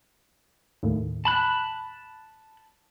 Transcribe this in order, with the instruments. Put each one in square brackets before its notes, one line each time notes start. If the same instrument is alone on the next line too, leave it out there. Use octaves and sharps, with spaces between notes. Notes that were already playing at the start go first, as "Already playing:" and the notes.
[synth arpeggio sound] D#2 A2
[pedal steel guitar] A5 B5 F#6